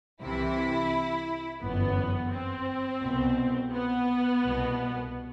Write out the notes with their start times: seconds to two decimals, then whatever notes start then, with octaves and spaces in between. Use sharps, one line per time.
0.22 C2 C3 E3 E4
1.63 G1 F#2 E3 B3
2.32 C4
3.02 C2 B2
3.73 B3
4.43 C2 B2